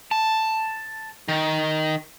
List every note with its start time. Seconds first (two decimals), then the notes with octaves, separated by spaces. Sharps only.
0.11 A5
1.28 D#3